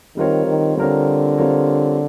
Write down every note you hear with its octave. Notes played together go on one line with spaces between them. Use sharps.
D#3 G3 C4 F4 A#4 C#5
D#3
D3 G3 C4 F4 A#4 C#5
G3 C4 F4 A#4 C#5